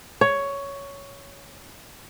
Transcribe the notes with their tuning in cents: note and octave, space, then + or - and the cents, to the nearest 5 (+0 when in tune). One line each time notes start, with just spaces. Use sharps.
C#5 +10